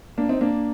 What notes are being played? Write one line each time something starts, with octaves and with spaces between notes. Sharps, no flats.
A#3 D4
C4 D#4
A#3 D4